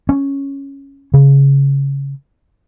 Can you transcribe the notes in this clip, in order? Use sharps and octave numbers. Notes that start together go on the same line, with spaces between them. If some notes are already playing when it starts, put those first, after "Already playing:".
C#4
C#3